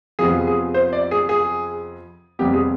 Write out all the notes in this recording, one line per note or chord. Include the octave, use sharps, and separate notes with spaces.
F2 C3 F3 B3 G#4
G#4
C5
D5
G#4
G#4
F2 C3 G3 B3 G4
G#4